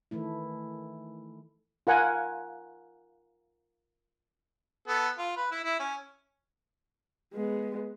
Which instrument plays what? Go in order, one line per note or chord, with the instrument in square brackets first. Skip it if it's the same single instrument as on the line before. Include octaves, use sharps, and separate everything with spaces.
[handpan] D#3 E3 A3 E4
[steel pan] F4 A#4 F#5 G#5
[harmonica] B3 A4
F4
B4
E4 E5
E4
C#4
[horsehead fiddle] G#3 B3